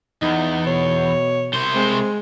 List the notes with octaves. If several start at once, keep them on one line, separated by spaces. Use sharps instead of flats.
E2 D#4
B2 C#5
C2 C5
G#3 C4